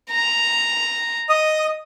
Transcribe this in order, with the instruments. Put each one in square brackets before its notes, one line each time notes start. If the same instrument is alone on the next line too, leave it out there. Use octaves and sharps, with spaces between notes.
[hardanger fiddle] A#5
[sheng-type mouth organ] D#5 D#6